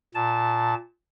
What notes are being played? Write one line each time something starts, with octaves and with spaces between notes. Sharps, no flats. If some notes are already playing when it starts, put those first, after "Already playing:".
A#2 A5